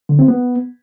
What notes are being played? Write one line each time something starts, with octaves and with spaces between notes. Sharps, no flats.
D3
C4
B3